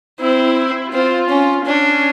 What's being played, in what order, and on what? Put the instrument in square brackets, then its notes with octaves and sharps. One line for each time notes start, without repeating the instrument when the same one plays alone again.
[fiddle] C4 [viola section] E4
[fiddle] C4 [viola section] F4
[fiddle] C#4
[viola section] C#4 [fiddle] D4